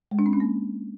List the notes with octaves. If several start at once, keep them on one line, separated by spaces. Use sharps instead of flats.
G#3
D4
C4
C#4
A#3